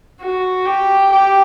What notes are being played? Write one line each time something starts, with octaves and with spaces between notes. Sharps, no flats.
F#4
G4
G4